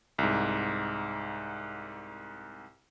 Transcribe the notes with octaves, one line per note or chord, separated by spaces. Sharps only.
C2 G#2